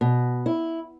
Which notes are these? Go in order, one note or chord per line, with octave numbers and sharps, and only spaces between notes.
B2
E4